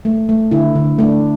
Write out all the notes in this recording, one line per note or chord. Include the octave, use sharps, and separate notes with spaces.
A3
A3
D3 E4
D3
A3 D4